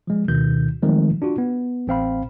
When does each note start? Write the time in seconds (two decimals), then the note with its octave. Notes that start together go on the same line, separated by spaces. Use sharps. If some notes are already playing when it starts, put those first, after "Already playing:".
0.07 F3 G#3
0.28 D2 B2 D#3 G6
0.82 D#3 F3 F#3 G#3 A3 C4
1.22 D4 F4 F#4
1.38 B3
1.87 A1 C4 F5 B5